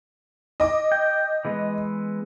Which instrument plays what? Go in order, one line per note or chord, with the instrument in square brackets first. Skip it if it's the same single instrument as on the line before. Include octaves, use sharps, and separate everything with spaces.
[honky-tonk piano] D#5 D6
[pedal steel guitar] G5
E3 G#3 B3